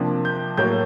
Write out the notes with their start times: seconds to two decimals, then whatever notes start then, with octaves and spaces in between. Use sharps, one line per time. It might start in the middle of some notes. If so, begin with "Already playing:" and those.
Already playing: C3 F3 A#3 D4
0.25 G6
0.57 A2 F#3 A#3 G6